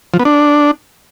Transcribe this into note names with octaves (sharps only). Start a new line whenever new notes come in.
F3
B3
D4